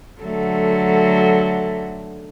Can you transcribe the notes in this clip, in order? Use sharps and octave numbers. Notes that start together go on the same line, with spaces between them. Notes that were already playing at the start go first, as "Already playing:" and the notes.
D3 F#3 A3